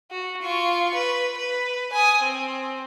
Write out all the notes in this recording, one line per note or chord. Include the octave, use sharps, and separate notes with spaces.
F#4
F4 C#6
B4
B4
G#5 D#6
C4